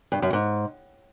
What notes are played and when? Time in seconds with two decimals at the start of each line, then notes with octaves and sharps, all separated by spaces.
0.12 G2
0.22 F#2
0.33 G#2